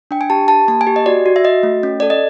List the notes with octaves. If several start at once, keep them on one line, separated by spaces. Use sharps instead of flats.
D4 G5
G#5
G4 A5
G4 A5
A#3 A5
G#5
G4
D#5
F#4 D5
F#4
E5
F#4 D#5
A3
C#4
A4 D5
D#5